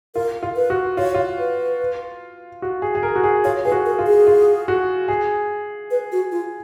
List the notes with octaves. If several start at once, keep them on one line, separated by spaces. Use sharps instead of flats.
F4 A#4
F4
B4
F#4
F4 C#5
F4
B4
F#4
G#4
G#4
A#4
F#4
G#4
F4 C#5
G#4 B4
F#4
A#4
F4
G#4
F4
F#4
G#4
B4
F#4
F4